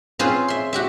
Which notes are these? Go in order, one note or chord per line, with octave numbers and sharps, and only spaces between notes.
C4 C#4 F4 G#4 B4 C5
E5 C6
F#4 G4 E5